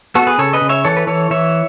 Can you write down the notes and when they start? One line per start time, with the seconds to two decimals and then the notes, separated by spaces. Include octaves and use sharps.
0.15 B3 F#4 A4
0.27 G#4 B4
0.38 C#3 A4 C#5
0.53 B4 D#5
0.61 C#3
0.69 C#5 E5
0.85 E3 A4 C#5
0.97 B4
1.07 E3 A4 C#5
1.30 E3 C#5 E5